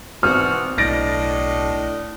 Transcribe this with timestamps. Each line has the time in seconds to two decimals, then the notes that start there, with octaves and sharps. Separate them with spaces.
0.23 G#1 B2 E3 C4 F#4 F6
0.78 B1 A2 D4 D#5 A6 A#6 D7